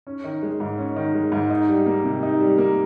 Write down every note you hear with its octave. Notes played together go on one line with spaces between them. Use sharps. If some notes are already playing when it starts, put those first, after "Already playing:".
C#4
D#3
G#3
G#2
C#4
D#3
G#3
G#2
D#4
G3
A#3
C3
D#4
G3
A#3